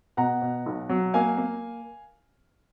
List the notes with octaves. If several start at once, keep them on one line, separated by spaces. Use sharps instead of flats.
B2 F#5 A#5
B2
B1
F#3
A#3 F5 G#5
A#3